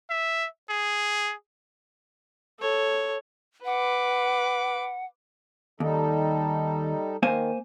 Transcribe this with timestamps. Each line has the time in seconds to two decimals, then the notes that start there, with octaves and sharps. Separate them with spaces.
0.10 E5
0.69 G#4
2.59 A4 C#5
3.65 B4 F#5 D6
5.80 D#2 G3 D#4 A4
7.23 D#3 A#3 C5 G#5